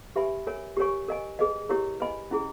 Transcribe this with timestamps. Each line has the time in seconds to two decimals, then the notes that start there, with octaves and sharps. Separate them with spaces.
0.16 G4 B4 E5 G#5 B5
0.47 A#4 C#5 G#5
0.77 G4 A#4 C#5 G#5 C#6
1.08 A#4 D#5 G#5
1.39 G#4 B4 D#5
1.69 E4 G4 A#4 C#5
2.00 B4 D#5 G#5 B5
2.31 C#4 E4 G#4